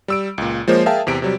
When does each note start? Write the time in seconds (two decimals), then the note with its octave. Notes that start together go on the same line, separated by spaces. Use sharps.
0.08 G3 E6 D7
0.38 C#2 A#2
0.68 F3 G#3 A#3 C5 C#5
0.86 G#4 A#4 E5 F5 G5 A5
1.07 E2 C3 D7
1.22 C3 F#3 G3